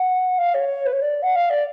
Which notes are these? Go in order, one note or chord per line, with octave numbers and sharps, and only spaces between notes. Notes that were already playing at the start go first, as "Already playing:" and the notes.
Already playing: F#5
F5
C#5
B4
C#5
D5
F#5
F5
D5